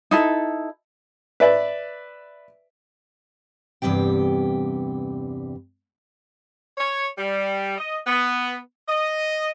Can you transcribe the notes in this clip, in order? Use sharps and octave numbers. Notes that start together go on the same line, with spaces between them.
D#4 E4 A4
B4 D5 E5
E2 G2 C3 G4 G5
C#5
G3
D#5
B3
D#5